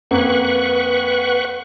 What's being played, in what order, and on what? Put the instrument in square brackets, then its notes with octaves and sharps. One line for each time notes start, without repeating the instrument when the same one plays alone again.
[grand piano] F2 A#3 C4 [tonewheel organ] B4 F#5 C#6